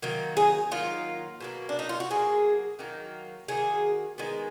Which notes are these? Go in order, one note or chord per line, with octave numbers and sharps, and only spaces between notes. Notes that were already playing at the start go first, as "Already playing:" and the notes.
D#3 F#3 A#3
G#4
D#3 F#3 A#3 F4
B2 F#3 A#3
D4
D#4
F4
F#4
B2 F#3 A#3 G#4
D#3 F#3 A#3
D#3 F#3 A#3 G#4
D#3 G#3 B3